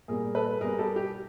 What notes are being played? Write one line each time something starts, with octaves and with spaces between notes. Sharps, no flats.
A#2 G3 G#4 A#4
A4 B4
B2 G3 G#4 A#4
G4 A4
G4